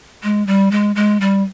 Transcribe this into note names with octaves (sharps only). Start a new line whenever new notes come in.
G#3
G3
G#3
G#3
G3